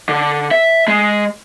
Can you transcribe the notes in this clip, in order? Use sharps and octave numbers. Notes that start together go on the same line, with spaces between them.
D3
E5
G#3